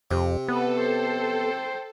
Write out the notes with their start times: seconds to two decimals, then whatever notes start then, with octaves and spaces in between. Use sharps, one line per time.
0.11 F2 C3
0.48 B3 A4 B4
0.80 C5 G5